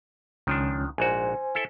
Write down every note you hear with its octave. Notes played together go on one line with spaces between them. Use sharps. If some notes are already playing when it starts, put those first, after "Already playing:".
C#2 D#3 F3 C#4 D4
A#1 G#2 F#4 C5 G#5
E4 A4 E5